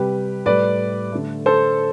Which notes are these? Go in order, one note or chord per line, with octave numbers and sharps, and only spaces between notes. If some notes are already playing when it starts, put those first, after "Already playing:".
Already playing: C3 G3 G4 B4
A2 G3 B4 D5
D3 A3
A4 C5